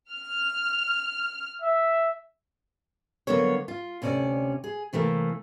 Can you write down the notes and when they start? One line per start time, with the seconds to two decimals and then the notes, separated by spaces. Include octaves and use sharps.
0.10 F6
1.62 E5
3.27 D3 F#3 A#3 B3 C#5
3.68 F4
4.02 D2 C3 C#4 A#4 D5
4.64 G#4
4.93 C3 E3 A3 A#3